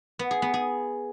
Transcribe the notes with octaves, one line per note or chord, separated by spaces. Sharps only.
B3
G#4
B3
G#4